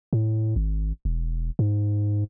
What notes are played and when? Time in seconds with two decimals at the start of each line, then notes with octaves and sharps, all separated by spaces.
0.13 A2
0.56 G#1
1.05 E1
1.59 G#2